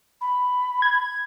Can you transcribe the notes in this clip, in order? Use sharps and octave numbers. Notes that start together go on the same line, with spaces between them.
B5
G#6